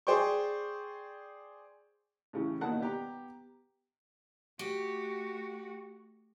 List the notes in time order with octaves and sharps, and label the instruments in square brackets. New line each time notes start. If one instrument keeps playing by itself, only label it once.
[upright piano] G#4 C5 D5 G5 C#6
[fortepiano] A2 C#3 E3
D#2 B2 D#3 F#5 A5 F#6
B3 G4 A#5
[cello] A3 F#4 [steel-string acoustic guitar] G4